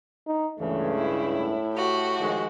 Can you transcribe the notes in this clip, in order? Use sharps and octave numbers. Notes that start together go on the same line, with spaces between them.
D#4
C#2 G2 C#3 E3 A3
E4
A2
F#4 G4
D#3 F3 G#3